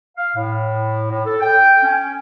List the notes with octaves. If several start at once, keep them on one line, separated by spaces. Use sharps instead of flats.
F5
A2
A2
A4
G5
C#4